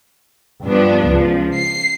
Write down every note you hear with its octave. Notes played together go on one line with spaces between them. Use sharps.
G2 F3 B3 D4
C#2 F3
C7